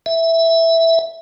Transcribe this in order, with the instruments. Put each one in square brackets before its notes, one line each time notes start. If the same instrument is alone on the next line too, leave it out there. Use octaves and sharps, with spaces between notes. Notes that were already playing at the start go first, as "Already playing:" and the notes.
[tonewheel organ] E5